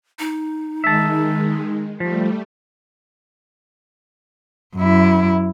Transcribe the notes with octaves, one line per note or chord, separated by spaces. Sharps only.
D#4
D#3 G#3 E5 A5
F3 G3 A3
F#2 E4